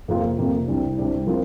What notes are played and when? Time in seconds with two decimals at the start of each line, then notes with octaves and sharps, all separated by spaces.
0.08 F2 C3 A#3 F4
0.38 F2 C3 A#3 F4
0.68 C2 C3 G3 D4
0.98 C2 C3 G3 D4
1.27 F3 C4 F4 A#4